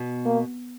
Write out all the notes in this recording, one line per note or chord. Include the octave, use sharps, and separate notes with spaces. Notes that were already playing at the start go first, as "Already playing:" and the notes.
Already playing: B2
A#3